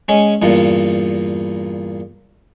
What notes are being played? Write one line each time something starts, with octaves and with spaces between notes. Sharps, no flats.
G#3 C#4
E2 G2 A#2